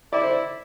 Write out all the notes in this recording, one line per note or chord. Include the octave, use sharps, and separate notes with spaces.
E4 D5
C5
D5